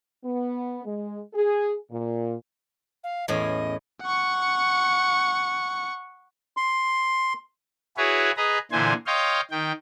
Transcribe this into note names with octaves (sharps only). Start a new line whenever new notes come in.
B3
G#3
G#4
A#2
F5
E2 A2 C#4 D#5
F#5 C#6
C6
E4 F#4 G#4 B4 C#5
G#4 B4 D#5 A#5
A#2 D3 E3 C5 G#5
C#5 D#5 F5 G5 C6
D#3 G5